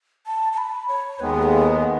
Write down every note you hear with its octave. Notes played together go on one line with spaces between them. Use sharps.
A5
A5
B5
C#5
D#2 D#3 G#3 B3 B4
A4